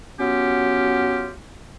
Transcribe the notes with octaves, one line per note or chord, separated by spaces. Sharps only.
F#3 B3 C#4 F4 G4